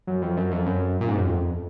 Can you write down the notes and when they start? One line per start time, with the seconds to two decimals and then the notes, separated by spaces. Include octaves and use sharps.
0.07 F#2
0.22 F2
0.37 F#2
0.51 F2
0.66 F#2
1.01 A#2
1.09 G#2
1.17 F#2
1.25 F2